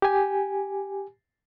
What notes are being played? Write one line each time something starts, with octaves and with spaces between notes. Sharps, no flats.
G4 G#5